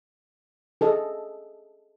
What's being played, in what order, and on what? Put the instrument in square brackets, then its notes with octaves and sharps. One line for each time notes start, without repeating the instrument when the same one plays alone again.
[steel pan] G#4 A4 D#5